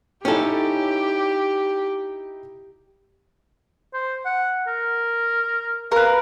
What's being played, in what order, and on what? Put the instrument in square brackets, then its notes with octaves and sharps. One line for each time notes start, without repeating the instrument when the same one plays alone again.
[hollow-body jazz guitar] C#4 A4 [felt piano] D#4 E4 G5 [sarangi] G4
[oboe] C5
F#5
A#4
[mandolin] A#4 B4 [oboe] F5